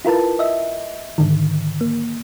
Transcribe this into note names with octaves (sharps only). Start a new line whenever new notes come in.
E4 F4 A#4 B4 A5
D#5 E5
G#2 D3 D#3
A#3